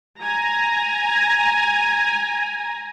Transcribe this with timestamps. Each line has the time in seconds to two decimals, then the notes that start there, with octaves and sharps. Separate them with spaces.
0.19 G#5 A#5